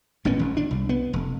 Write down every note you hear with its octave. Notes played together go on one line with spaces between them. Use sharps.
G#1 A#2 B3 C#4
G#1
D4
C2
B3
F1